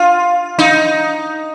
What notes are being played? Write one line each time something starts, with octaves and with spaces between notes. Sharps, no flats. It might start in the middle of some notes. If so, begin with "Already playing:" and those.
Already playing: F4
D#4